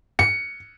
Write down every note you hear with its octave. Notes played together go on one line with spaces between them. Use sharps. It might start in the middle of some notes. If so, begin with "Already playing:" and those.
C#7